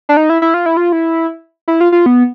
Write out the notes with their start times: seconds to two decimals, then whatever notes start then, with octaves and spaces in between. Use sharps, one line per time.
0.09 D4
0.17 D#4
0.30 E4
0.42 E4
0.54 F4
0.66 E4
0.77 F4
0.92 E4
1.68 E4
1.81 F4
1.92 F4
2.06 B3